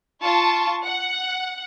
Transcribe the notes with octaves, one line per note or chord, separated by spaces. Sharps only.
F4 A5 C#6
F#5